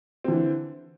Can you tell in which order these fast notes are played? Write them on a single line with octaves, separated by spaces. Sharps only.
C4 D3 E3